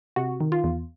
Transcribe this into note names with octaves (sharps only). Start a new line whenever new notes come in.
C3 F#4
D#3
F4
E2